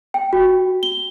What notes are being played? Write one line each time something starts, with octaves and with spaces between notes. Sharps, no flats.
G5
F#4
G7